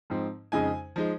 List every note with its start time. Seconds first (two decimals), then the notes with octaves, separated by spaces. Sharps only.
0.10 G#2 F3 C4 D#4
0.52 F2 C#3 G#3 D#4 G#5
0.96 F3 G#3 D#4